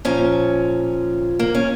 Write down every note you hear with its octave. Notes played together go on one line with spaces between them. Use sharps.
A#2 F3 C#4
A#3
C#4